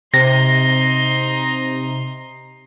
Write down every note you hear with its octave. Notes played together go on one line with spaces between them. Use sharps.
C3 D#4 C6 A#6